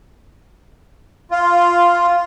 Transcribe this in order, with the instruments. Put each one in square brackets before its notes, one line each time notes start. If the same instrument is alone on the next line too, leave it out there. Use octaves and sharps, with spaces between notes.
[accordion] F4